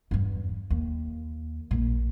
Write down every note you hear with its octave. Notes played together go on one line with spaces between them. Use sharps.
E2 G2
D#2
A#1 A#2